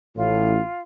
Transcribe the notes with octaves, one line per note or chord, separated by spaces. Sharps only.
A1 A2 F4